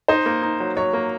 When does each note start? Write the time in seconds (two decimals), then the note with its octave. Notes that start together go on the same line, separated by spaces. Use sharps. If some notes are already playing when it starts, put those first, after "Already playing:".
0.08 D#4 C5
0.26 A#3
0.43 D#4
0.60 F#3
0.77 F#3 C#5
0.93 A#3